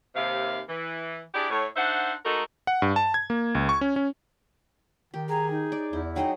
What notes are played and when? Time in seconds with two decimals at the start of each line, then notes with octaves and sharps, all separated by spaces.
0.15 D#2 C3 F5
0.69 E3
1.35 D4 E4 G4 G#4 D5
1.51 A2 C#5
1.76 D4 D#4 C5 E5 F#5
2.25 G#3 A3 D#4 F#4 A4 A#4
2.67 F#5
2.82 G2
2.96 A5
3.14 G#6
3.30 A#3
3.55 C#2
3.69 C#6
3.81 C#4
3.96 C#4
5.14 D#3 G4
5.29 G#4 A#5
5.50 D#4
5.72 D5
5.93 E2 E4
6.16 F#3 D#4 G#4 D#5 G5